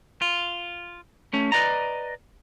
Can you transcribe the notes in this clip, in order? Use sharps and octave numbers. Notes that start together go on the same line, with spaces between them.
F4
A3 C#4
B4 D5 D#5 A#5